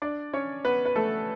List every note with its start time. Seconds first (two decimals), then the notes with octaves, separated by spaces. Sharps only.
0.02 D4 D5
0.33 C#4 C#5
0.65 B3 B4
0.85 B4
0.96 A3 A4